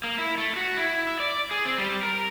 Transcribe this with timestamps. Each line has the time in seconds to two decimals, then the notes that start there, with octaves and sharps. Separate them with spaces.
0.04 A#3
0.18 E4
0.38 A3
0.56 F#4
0.77 E4
1.07 E5
1.20 D5
1.51 G#4
1.65 C4
1.78 G3
2.03 A#4